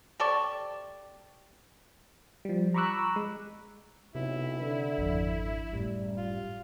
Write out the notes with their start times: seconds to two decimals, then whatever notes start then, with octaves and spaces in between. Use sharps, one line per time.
0.20 C3 A4 D5 C#6
2.45 F3 G3
2.74 A#5 B5 C#6 D6 E6 F#6
3.16 G#3
4.15 B1 C3 E4
4.61 D3
4.98 G#1 F2 F3
5.73 F#1 F#2 A2 G3
6.17 F4